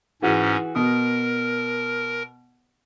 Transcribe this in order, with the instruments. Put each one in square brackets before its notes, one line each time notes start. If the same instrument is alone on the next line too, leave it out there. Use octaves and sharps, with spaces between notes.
[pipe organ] G#2 C#4 [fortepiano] E3 F#4 G#4
[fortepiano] B2 D#6 [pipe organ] A#4